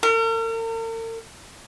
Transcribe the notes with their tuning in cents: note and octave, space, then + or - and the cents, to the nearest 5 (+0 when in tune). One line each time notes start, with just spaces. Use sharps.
A#4 -45